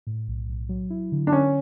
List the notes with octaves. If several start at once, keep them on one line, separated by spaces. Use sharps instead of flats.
A2
B1
B1
F#3
E4
D3
D4
D3 C#4